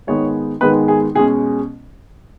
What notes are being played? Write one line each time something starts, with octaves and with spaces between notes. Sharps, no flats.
G#2 D#3 G#3 B3 D#4 C#5
G#2 D#3 G#3 B3 D#4 B4
G#4
B2 G#3 C#4 G#4